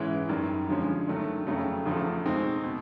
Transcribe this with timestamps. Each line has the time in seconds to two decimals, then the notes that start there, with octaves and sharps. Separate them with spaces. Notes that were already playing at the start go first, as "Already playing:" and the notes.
Already playing: G#2 E3 G#3 C#4 E4
0.29 F#2 D#3 G3
0.67 D3 F3 G#3 C#4
1.08 G2 D#3 F#3 A3
1.47 F2 C#3 F#3 A3
1.85 E2 C#3 F3 A3
2.24 B2 G#3 C4 D#4
2.63 B2